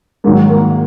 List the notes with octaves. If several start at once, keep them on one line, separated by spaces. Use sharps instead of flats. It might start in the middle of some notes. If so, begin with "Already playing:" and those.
G#2 D#3 F#3 A#3
A#3